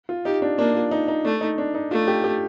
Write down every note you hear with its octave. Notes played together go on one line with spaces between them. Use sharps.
F4
D#4 G4
D4
A#3 D4
F4
D#4
D#4
A3 D4
D#4
D4
D#4
A3 F4
G4
G4